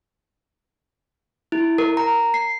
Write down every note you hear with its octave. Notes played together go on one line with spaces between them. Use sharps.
E4
A#4
A#5
C7